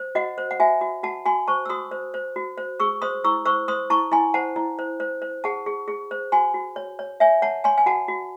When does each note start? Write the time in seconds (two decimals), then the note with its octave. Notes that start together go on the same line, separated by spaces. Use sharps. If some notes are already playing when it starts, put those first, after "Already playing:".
Already playing: C5
0.15 F#4 D#5 F#5
0.38 C5
0.51 F#5
0.60 F#4 E5 G#5
0.81 F#4
1.03 F#4 F#5 A5
1.26 F#4 G#5 C6
1.48 C5 A5 C#6
1.66 E6
1.69 F#4 C6 D#6
1.91 C5
2.14 C5
2.36 F#4
2.58 C5
2.80 G#4 C#6 E6
3.02 C5 C6 D#6
3.24 E4 C#6 E6
3.46 C5 C#6 E6
3.68 C5 C6 D#6
3.90 E4 A5 C#6
4.12 E4 G#5 C6
4.34 C5 F#5 A5
4.56 E4
4.79 C5
5.00 C5
5.22 C5
5.44 G#4 F#5 A5
5.66 G#4
5.88 G#4
6.11 C5
6.32 F#4 G#5 C6
6.54 F#4
6.76 C#5
6.99 C#5
7.20 C#5 E5 G#5
7.42 C#5 F#5 A5
7.64 C#5 G#5 C6
7.78 G#5
7.86 F#4 F#5 A5
8.08 F#4